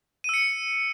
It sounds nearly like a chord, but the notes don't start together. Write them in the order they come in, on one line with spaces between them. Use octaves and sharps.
D#7 E6 C#7